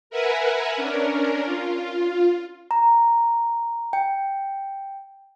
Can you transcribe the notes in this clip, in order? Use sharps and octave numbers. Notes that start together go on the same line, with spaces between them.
A#4 B4 E5 F#5 G#5
C#4 D4 A#4
F4
A#5
G5